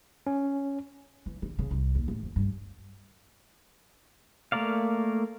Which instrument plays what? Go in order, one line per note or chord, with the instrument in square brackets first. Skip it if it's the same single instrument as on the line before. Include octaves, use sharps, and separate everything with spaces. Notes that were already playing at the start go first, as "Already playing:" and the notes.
[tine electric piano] C#4
[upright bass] E3
D3
C#3
C2
D#2
A2
F2
G2
[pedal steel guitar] A3 A#3 A#4 D5 F5